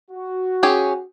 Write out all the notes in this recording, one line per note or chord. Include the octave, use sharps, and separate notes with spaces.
F#4
C#4 G4 G#4